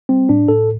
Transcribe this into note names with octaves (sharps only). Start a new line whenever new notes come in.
G3 C4
A2 D4
A2 A4